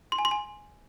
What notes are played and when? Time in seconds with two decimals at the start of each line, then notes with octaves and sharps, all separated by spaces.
0.12 C6
0.19 G#5
0.25 C6
0.31 G#5